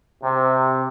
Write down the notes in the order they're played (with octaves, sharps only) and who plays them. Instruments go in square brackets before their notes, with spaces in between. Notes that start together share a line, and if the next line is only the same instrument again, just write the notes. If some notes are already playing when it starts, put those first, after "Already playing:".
[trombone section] C3